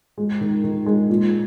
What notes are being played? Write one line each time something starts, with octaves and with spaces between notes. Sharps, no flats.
G#3
D#3
D#3
G#3
A#2